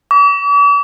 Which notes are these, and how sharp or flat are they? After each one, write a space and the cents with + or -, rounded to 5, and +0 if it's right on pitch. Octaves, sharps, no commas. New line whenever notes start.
D6 -45